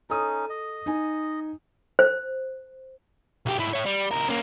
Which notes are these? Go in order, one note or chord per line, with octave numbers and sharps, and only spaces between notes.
C#4 D#4 A4 D#6
D#5
D#4 G#5
C5
B1 G4
G#2 E4
E4 C#5
G3
C#2 A#4
A#3 C#4